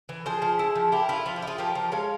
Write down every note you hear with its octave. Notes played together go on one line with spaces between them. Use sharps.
E3
F3 G#4 C5
F3
E4
F3
E4 G4 A#4
E4 F4
F3 F4
G4
E4
F4 G#4
F3 G4 A#4
F3
G#3 C#5 F5